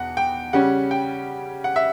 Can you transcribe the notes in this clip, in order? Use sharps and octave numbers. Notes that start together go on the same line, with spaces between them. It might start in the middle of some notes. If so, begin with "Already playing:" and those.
Already playing: E2 B2 F#5
G5
C#3 G3 C#4 F#5
G5
F#5
E5